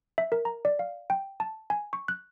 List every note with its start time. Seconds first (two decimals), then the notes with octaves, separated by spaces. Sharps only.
0.18 E5
0.32 A#4
0.45 A#5
0.65 D5
0.79 F5
1.10 G5
1.40 A5
1.70 G#5
1.93 C#6
2.08 F#6